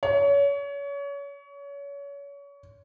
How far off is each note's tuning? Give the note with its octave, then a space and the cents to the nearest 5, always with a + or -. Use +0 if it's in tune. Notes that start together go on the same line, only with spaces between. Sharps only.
C#5 +30